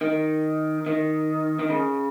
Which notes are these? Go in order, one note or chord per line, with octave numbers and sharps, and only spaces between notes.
D#3
D#3
D#3
C#3